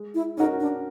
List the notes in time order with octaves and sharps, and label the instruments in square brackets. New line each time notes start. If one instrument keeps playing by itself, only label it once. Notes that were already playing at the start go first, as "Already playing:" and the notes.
Already playing: [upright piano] G#3
[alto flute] E4
[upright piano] C#4 F#4 A#4 [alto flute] D#4
[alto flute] D4